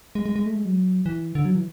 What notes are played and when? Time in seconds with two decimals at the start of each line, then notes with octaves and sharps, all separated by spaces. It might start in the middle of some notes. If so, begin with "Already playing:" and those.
0.15 G#3
0.26 G#3
0.36 G#3
0.46 A3
0.55 G#3
0.65 F#3
1.06 E3
1.35 D3
1.45 F#3
1.55 E3